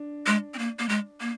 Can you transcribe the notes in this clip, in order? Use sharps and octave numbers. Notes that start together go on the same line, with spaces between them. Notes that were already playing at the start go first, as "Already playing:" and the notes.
Already playing: D4
G#3
C4
A#3
A#3
G#3
A#3